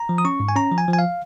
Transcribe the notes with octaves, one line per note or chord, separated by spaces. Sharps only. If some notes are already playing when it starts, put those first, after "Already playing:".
Already playing: A#5
F3
D#6
C#4 C#6
G#2
G#5
C#4 A#5
F3
G#5
F3
G#5
F5